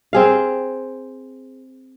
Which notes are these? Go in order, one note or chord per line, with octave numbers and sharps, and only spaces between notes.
C4 G#4 F5